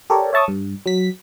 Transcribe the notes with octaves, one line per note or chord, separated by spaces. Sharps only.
G4 A4 A#4 C#5 D5
C#5 E5 A5 C#6 D#6
G2
F#3 B6